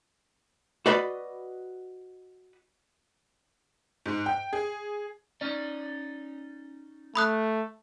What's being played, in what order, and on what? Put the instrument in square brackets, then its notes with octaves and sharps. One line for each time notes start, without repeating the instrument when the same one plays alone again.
[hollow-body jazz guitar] F#4 B4 D5 D#5 B5
[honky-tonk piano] G#2
G5
G#4
[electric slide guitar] C#4 D#4 D5
[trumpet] A3 [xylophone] B5 D#6 F#6